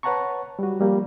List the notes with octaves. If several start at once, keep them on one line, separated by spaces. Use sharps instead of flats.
B4 C#5 F#5 A5 A#5 C#6
G3 F#4
F3 G3 A#3